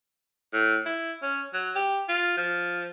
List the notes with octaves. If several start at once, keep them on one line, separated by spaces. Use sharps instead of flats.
A2
E4
C#4
F#3
G4
F4
F3